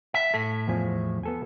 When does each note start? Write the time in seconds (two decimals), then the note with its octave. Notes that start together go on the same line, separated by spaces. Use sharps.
0.14 E5 F#5
0.34 A2 A4
0.68 E2 F3 G#5
1.23 B3 A4 G#5